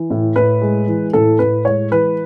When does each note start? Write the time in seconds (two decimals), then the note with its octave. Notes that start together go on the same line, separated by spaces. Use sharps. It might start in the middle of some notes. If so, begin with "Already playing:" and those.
Already playing: E3
0.10 A2
0.36 A2 B4
0.61 G#3
0.87 E3
1.13 A2 A4
1.39 A2 B4
1.65 G#3 C#5
1.91 E3 B4